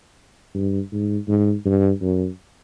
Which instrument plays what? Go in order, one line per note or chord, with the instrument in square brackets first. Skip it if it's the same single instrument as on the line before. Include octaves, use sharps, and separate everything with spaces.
[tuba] G2
G#2
G#2
G2
F#2